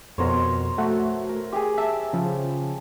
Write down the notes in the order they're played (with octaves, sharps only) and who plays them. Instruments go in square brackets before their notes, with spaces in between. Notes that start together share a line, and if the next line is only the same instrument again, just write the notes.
[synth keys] F2 B2 [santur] A#4 C5 C#5
[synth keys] A3 F#4
[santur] A#4
G4 G#4
[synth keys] E5 [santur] A5
[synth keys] C#3 F3